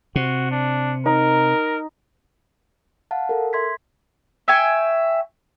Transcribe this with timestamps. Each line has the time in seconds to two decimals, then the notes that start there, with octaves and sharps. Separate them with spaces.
0.16 C3 F#4
0.51 D4
1.06 D#4 A#4
3.11 F5 F#5 A5
3.29 A4 A#4
3.53 E5 C6 G#6 B6
4.48 E5 G5 G#5 C#6